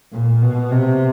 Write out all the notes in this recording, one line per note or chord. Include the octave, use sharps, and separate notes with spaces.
A#2
B2
C3